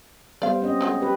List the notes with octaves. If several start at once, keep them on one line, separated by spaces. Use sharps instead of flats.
G3 B3 C5 D5 F5
C4 C#4 D#5
F#3 G#3 C#5
G4 B4